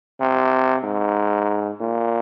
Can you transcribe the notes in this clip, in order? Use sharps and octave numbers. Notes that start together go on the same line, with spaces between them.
C3
G#2
A#2